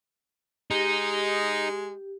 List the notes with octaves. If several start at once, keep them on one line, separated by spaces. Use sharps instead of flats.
G#3 D#4 G4